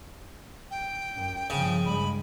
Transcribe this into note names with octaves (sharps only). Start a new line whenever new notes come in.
G5
F#2
G1 C#3 F3
G2 G#3 B5